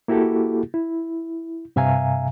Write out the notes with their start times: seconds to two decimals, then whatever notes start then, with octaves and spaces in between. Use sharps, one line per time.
0.08 A#3 E4 F#4 G4 A4
0.74 E4
1.76 G2 C3 E5 F5 G#5 A#5